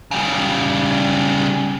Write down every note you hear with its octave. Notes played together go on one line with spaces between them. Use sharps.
C#3 G3